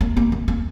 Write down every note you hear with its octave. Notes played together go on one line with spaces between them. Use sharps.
A#3
A#3
A#3
A#3